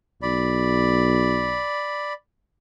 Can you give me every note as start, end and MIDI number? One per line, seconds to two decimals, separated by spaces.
0.22 1.66 35
0.22 2.13 74
0.22 2.13 83